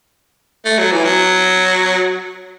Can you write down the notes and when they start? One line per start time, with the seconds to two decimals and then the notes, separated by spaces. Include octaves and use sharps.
0.65 A3
0.78 F#3
0.92 E3
1.05 F#3